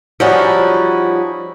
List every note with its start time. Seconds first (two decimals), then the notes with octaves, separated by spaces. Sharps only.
0.20 F3 G3 C#4 D#4 E4 F#4